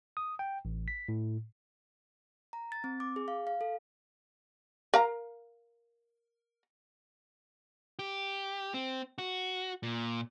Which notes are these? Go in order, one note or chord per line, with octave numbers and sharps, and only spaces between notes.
D#6
G5
A1
B6
A2
A#5
A6
C4
D6
G#4
F5
F5
A4
A#4 F5 A#5
G4
C4
F#4
A#2